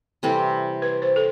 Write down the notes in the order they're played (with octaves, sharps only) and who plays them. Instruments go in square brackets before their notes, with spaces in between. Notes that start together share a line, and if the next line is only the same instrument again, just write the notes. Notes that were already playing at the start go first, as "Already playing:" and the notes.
[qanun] C3 E3 G3 C4 [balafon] A4
[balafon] B4
C5
A4